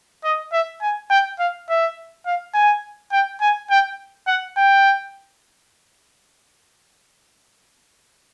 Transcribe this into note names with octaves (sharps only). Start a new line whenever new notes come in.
D#5
E5
G#5
G5
F5
E5
F5
G#5
G5
G#5
G5
F#5
G5